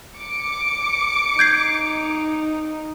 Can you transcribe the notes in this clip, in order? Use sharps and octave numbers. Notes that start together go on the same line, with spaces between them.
D6 C#7
D#4 G6 G#6 C7